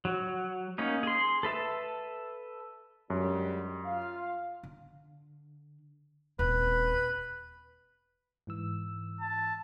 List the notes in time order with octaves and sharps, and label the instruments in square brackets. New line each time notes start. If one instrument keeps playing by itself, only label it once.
[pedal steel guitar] F#3
A#3 C#4 D#4
G#4 C6
A4 B4 E5 A5
[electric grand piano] F#2 [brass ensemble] D3 G3 G#3
[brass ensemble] F4 F5
[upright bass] D3
[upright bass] D#1 C4 [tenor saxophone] B4
[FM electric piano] G#2 E3 E6
[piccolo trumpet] A5